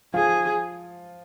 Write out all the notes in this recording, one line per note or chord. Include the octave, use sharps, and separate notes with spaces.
F3 F4 G#4